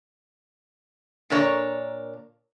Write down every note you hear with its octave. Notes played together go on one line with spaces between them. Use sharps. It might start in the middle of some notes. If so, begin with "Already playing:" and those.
A#2 D4 A#4 C#5 G#5 A#5